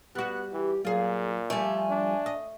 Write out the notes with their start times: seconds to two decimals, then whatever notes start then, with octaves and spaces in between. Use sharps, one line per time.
0.15 G3 B3 F#4 F#6
0.53 E3 G4
0.85 A#2 F#3 F4 G#4
1.50 F3 G3 A3 G#5
1.90 D4
2.26 D#5